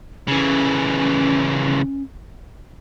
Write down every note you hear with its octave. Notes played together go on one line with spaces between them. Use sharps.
C#3 E3 C#4